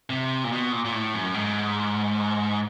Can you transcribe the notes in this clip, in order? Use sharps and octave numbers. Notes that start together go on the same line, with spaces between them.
C3
A#2
B2
A#2
A#2
A2
F#2
G#2